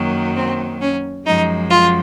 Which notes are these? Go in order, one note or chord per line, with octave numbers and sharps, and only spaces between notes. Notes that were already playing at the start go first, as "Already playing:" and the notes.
Already playing: F#2 D#3 F#3 A#3
C4
C#4
F#2 F3 G#3 D#4
F4